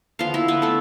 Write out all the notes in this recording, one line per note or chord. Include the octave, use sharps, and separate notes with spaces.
D3 F3 B3 F4 F5
E4 E5
B3 B4
A3 A4